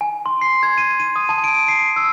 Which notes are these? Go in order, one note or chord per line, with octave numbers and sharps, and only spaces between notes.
G#5
C6
C7
G#6
D#7
D#7
D#6
A5
D7
C7
E6